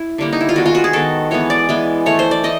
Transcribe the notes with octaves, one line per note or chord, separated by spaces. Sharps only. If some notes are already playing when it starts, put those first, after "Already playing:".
Already playing: E4
D3 G3 A#3
D#4
E4
F4
D#3 G#3 B3 F#4
F4
F#4
G#4
D#3 G#3 B3 A4
E3 G#3 B3 C#5
D5
E3 G#3 B3
E3 A3 C#5
C5
D5
E3 D#5